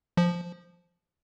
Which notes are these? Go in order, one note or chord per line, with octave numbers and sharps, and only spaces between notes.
F3